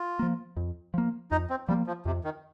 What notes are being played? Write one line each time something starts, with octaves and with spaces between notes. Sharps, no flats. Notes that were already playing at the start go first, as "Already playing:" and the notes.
Already playing: F4
F3 A#3
F2
F3 A#3
F2 D#4
C4
F3 G3 A#3
F3
F2 C3
D#3